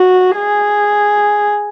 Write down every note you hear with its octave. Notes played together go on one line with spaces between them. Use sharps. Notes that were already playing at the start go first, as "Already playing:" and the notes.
Already playing: F#4
G#4